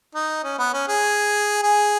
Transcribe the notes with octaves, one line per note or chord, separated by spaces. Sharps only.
D#4
C#4
B3
C#4
G#4
G#4